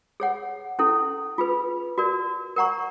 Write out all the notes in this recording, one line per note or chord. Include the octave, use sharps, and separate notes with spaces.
G#4 C#5 F#5
C#4 E4 A4
F4 G#4 B4
F#4 A#4 D5
A#4 D5 F#5 A#5 C#6